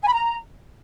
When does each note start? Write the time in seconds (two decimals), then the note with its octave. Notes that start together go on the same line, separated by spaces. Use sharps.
0.02 G#5
0.08 B5
0.13 A#5